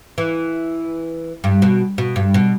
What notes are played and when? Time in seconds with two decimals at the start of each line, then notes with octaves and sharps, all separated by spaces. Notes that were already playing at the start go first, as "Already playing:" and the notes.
0.18 E3
1.44 G2
1.62 B2
1.98 B2
2.16 G2
2.34 B2